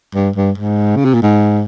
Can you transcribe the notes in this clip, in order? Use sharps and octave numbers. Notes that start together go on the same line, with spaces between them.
G2
G2
G#2
C#3
C3
A#2
G#2